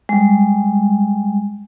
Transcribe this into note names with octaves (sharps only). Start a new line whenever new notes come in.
G3 G#3